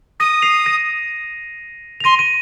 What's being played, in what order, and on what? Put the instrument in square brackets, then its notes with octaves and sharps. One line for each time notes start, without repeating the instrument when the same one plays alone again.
[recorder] D#6 [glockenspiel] A#6 D#7
[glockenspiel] C7 F7
A#6 D#7
F7
[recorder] C6 [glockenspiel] A#6 D#7
[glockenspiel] D#7